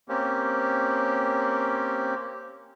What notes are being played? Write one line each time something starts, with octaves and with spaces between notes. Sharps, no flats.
A#3 C4 C#4 G4